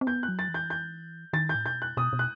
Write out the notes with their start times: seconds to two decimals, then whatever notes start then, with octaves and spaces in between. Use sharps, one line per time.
0.01 C4
0.07 B3 G6
0.23 F#6
0.29 F#3
0.39 A6
0.49 E3
0.54 G6
0.70 G6
1.33 D#3 A6
1.49 G6
1.55 A2
1.66 B2 G6
1.82 F#6
1.97 B2 D#6
2.13 B2
2.19 F#6